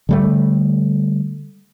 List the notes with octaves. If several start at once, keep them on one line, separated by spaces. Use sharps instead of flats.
D3 G3 A3